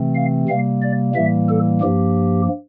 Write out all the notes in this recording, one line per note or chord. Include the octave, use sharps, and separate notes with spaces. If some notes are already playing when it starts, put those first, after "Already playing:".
Already playing: C3 E3 A3 C4
F5
C3 G3 A#3 F5
D5
A2 E3 G3 A#3 E5
A4
G2 F3 A#3 G4